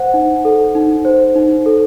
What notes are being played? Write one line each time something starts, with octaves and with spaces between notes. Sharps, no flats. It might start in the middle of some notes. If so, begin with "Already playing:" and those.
Already playing: C5 F#5
D#4
A4
D#4
C5
D#4
A4